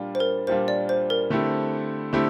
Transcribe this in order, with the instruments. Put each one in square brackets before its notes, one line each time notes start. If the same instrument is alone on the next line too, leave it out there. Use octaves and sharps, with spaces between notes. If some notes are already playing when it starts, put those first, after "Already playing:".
Already playing: [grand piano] A#2 G3 D4 F4
[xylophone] C5
A#4
[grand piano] A#2 G3 D4 F4 [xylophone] C5
[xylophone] D5
C5
A#4
[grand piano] D3 A3 C4 E4 G4
D3 A3 C4 E4 G4